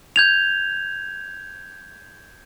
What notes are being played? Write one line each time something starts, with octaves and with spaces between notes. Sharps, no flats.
G6 G#6 F7